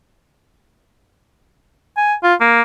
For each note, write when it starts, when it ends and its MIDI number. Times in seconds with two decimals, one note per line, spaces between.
1.97 2.14 80
2.23 2.34 65
2.41 2.62 58